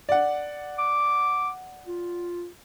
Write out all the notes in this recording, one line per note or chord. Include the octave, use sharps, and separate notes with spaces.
D5 F#5
D6
F4